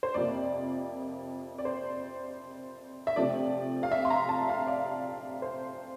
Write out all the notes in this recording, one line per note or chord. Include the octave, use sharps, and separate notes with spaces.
C5
F2 C3 F3 A#3 D5
D5
C5
E5
C3 F3 A3 D5
F5
E5
C6
A#5
A5
F5
D5
C5